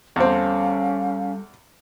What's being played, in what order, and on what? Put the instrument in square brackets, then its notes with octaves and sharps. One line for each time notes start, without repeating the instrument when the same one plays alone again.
[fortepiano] E2 C4 [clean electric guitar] G3 G4 A4 [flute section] C#4 F5